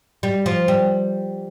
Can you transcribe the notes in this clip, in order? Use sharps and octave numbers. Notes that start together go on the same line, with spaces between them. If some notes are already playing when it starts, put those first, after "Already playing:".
G3
F3
G3